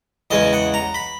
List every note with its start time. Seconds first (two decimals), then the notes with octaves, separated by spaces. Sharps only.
0.31 E2 C#3 G#3 D#5
0.53 F#5
0.74 A#5
0.94 B5